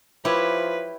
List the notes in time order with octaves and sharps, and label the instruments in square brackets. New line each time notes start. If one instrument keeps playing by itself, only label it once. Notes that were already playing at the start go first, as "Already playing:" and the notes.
[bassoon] F3 [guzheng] E4 G4 C#5 [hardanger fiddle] B4